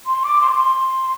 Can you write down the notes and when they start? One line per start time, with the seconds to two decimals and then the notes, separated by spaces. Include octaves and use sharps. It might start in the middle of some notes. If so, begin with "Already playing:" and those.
0.06 C6
0.24 D6
0.41 C6
0.48 D6
0.56 C6